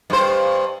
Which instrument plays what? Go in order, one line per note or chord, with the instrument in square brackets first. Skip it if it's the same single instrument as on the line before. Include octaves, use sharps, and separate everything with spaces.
[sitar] G2 C5